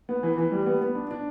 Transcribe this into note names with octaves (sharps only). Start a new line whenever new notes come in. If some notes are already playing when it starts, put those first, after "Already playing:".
B3
E3
E3
G3
B3
B3
D4
D4